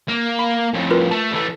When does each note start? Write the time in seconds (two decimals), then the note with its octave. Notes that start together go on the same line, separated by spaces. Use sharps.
0.08 A#3
0.39 B5
0.74 F2 A2
0.91 F4 A#4 B4
1.11 A3 A5
1.32 E3 A3